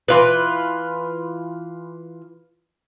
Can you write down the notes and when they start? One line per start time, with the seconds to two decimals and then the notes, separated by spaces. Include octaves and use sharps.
0.08 E3 F4 B4